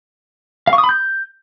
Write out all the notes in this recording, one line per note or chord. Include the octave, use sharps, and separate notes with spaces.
F5
C#6
D#6
B5
G6